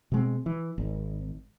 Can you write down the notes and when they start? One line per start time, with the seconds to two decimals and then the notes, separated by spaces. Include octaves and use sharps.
0.12 B2 G#3 C4
0.46 E3
0.78 G#1